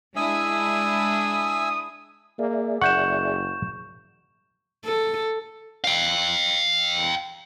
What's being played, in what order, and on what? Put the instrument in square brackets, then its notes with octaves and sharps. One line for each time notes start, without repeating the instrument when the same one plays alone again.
[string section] G#3 D4 E4 [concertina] E5 G#5 E6 [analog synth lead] D#6
[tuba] A#3 [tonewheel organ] G#4 D5 E5
[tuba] F#1 [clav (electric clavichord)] F#5 [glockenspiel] C#6 G6 E7
[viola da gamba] A4
[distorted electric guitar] F5 G5